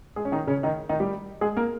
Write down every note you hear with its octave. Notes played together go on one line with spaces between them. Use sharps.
G#3 G#4
C#4
D#3 D#4
C#3 C#4
D#3 D#4
D#3 D#4
G3 G4
G#3 G#4
A#3 A#4